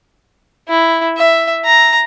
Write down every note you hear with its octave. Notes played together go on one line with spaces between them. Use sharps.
E4
E5
A#5